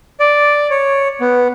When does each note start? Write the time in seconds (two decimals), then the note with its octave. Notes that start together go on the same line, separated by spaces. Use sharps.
0.20 D5
0.70 C#5
1.21 B3